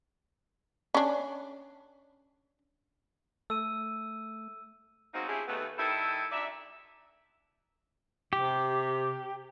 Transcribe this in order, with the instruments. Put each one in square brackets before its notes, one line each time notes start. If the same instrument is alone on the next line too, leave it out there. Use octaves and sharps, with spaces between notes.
[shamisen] C#4 D4
[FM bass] A3 [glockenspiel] E6 D#7
[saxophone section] G#3 A#3 C4 C#4 D#4 F#4
A3 C#4 E4 F4 G4 G#4
D#2 A3 B3
D#3 G3 E4 A4
D2 D#4 D5 E5
[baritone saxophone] C3 [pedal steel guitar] G4